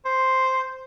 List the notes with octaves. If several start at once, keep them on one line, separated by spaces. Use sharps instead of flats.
C5